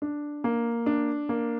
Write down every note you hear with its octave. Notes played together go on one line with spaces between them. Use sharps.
D4
A#3
D4
A#3